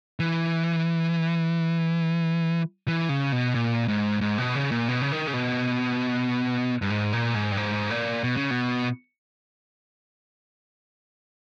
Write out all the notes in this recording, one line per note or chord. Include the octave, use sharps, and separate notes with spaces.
E3
E3
C#3
B2
A#2
G#2
G#2
B2
C#3
A#2
B2
C#3
D#3
C#3
B2
G2
G#2
A#2
G#2
G2
G#2
A#2
B2
C#3
B2